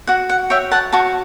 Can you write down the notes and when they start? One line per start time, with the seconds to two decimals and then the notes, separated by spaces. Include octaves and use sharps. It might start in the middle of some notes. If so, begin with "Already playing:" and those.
0.07 F#4 F#5
0.30 F#5
0.50 C#5 E5 G5
0.71 F#5 A5
0.92 F#4 A5 C#6